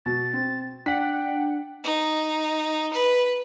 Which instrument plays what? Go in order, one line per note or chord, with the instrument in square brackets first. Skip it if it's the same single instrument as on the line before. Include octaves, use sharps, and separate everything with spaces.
[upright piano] B2 [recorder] A6
[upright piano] C4
[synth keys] D4 F#5 [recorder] G5 [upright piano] B6
[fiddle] D#4
B4